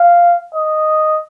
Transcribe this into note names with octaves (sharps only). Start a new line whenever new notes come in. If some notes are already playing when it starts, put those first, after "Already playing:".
Already playing: F5
D#5